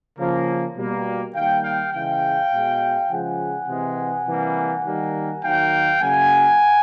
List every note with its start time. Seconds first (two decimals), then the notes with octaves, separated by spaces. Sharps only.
0.18 C#3 F3 A#3
0.77 B2 G3 A#3
1.35 D#3 G3 A#3 F5 G5
1.64 F5 G5
1.93 C#3 E3 G#3 F5 G5
2.52 B2 G#3
3.09 C#3 F3 G#3 F#5 G#5
3.67 C3 E3 G#3
4.27 C3 E3 G3 A#3
4.85 D#3 G3 A#3
5.43 D#3 F#3 A#3 F5 G5
6.01 C#3 F#3 A#3 F#5 G#5